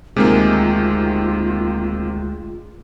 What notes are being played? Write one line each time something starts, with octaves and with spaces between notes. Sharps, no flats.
D2 C3 D#3 G#3 A#3 F4